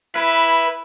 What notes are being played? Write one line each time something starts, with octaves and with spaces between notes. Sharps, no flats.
E4 B4